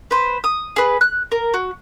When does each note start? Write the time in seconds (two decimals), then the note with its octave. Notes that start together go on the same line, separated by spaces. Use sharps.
0.11 B4 C5
0.44 D#6
0.76 G#4 B4
1.01 F#6
1.32 A#4
1.54 F#4